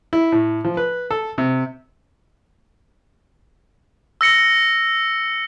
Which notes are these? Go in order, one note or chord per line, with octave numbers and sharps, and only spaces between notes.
E4
A2
F3
B4
A4
C3
E6 A#6 C#7